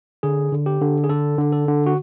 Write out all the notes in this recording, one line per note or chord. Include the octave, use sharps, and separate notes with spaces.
D3 G#4
D3
G4
D3
G#4
D3 A4
D3
A4
D3
F#4